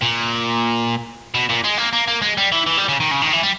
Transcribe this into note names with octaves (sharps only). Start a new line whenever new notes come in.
A#2
B2
A#2
G#3
A#3
A#3
A#3
G#3
G3
E3
E3
G3
C#3
D#3
C#3
D#3
E3
G3